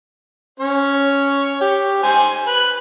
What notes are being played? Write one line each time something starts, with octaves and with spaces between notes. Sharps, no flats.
C#4 C#5
G4
C5 G#5
B4